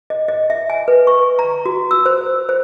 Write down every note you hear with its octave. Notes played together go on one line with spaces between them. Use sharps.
D#5
D#5
E5
G#5
B4
C#6
A#5
F#4
E6
C5
C5